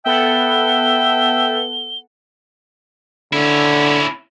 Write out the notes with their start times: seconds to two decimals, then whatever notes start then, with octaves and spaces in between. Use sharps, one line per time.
0.06 B3 A4 E5 F#5 G5 G7
3.33 D3 C#4 E4